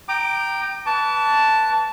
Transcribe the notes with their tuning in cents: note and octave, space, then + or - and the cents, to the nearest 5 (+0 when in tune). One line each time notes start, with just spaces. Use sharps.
G5 -10 A#5 +0 D6 +30
B4 +0 A5 +0 D6 -45